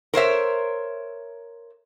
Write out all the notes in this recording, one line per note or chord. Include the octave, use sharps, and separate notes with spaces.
A#4 C5 C#5 E5